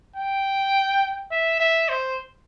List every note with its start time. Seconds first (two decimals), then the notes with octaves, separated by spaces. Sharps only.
0.16 G5
1.31 E5
1.60 E5
1.89 C5